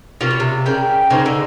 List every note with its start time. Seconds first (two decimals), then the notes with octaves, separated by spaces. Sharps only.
0.21 C3 A#3 C#4 F4
0.31 B2
0.40 C3
0.66 C#3 G4 A#4 D5 G5
1.10 C#3 A#3 D#4 G#4 C5
1.26 D3